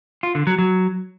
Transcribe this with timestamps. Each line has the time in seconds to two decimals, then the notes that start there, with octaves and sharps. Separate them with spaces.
0.23 F4
0.35 D3
0.47 F#3
0.59 F#3